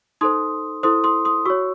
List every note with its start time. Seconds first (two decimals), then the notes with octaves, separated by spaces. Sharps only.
0.21 D#4 A4 C5 C6 D#6
0.83 E4 A4 C5 C6 D#6
1.04 C6 D#6
1.25 C6 D#6
1.46 F#4 C#6 E6
1.50 C#5